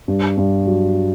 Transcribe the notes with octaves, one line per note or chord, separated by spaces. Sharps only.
G2
G2
F#3